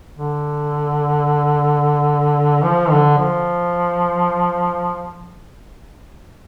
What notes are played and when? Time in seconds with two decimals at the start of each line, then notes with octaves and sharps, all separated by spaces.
0.17 D3
2.64 F3
2.91 D3
3.18 F3